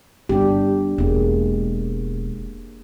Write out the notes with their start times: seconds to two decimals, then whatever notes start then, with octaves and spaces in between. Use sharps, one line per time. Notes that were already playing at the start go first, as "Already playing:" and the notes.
0.29 G1 D4 G4
0.98 E1 G#3 A#3